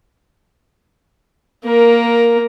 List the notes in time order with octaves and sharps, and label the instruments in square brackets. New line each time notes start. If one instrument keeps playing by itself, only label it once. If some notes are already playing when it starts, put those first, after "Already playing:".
[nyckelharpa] A#3 A#4